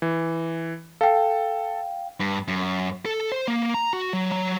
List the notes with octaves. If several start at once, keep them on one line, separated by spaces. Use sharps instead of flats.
E3
A4 F5 G5
G2
F#2
A4
C5
A#3
A#5
F#4
F#3
F#3